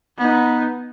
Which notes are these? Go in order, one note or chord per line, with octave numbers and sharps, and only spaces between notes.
B3 D#4